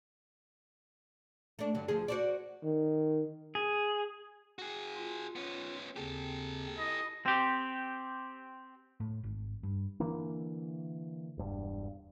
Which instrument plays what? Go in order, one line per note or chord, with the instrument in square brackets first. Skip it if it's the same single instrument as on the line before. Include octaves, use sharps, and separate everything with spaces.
[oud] A3 D4
G2 D3 F#3
D2 F3 G#4
F#4 C5 D5
[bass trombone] D#3
[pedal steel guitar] G#4
[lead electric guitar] F#4 G#4
[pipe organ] F4
[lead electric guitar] B3 C#4
[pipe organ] D#2 C#3 C4 [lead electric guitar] G4 A4
[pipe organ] E4 [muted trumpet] D#5
[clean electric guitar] C4 G4
[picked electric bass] A2
G#1
G2
D3 E3 A#3
E1 G2